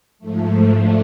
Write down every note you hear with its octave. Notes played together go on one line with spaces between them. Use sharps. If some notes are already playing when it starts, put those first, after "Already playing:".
G#2 F3 A3
F3 A3 D4